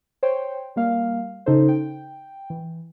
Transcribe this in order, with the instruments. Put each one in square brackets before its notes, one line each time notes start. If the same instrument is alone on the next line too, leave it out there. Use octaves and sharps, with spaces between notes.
[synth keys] C5 C#5 G5
G3 A#3 F5
C#3 D#4 A4 C5
G5
E3